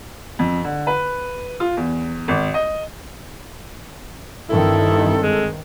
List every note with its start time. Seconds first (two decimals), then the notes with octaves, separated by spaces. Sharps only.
0.39 F2
0.64 D3
0.87 B4
1.60 F4
1.77 E2
2.28 G#1
2.54 D#5
4.49 G2 D#3 C4 E4 A4
5.23 G#3